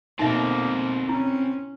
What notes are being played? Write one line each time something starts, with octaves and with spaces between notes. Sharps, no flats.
B2 A#3 C4 D#4 A4 A#4 E5
C#4 E4